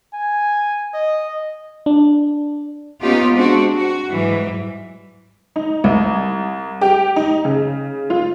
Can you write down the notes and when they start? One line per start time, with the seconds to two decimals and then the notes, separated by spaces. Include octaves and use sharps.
0.14 G#5
0.94 D#5
1.86 D4
3.01 A#3 B3 C#4 D#4 F4 G4
3.33 G#3 C4 D4 F#4
3.77 F#4
4.10 G#2 E3 F#3 G3
5.56 D#4
5.84 C2
6.81 G4
7.16 D#4
7.45 C#3
8.10 F4